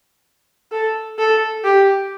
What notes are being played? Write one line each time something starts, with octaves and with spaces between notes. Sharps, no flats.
A4
A4
G4